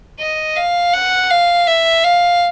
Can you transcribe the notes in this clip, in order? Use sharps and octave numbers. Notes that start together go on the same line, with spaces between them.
D#5
F5
F#5
F5
E5
F5